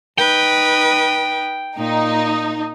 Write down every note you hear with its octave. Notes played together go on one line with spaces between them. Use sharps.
D#4 B4 G5
A#2 D#4